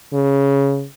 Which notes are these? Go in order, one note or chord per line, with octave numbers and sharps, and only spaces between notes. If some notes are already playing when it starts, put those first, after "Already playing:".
C#3